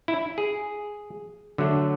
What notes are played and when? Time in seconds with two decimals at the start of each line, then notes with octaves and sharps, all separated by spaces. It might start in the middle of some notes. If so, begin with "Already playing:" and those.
0.08 E4
0.38 G#4
1.58 D3 F#3 A3